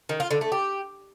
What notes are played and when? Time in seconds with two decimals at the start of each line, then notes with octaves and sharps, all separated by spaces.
0.09 D#3
0.20 F4
0.31 D3
0.41 A3
0.52 G4